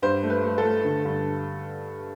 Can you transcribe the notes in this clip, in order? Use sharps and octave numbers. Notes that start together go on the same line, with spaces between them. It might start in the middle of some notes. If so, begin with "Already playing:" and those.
G2 C5
A3
B4
A3
A4
A3
D3
G2